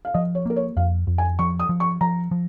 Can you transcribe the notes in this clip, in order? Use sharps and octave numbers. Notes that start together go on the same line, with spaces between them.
F5
F3 D#5
C#5
A#3 A#4
C#5
F2 F5
F2
G#5
F3 C#6
D#6
F3
C#6
F3 A#5
F3